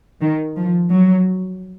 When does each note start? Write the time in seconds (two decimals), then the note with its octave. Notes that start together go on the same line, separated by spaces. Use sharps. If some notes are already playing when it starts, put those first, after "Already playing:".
0.21 D#3
0.56 F3
0.91 F#3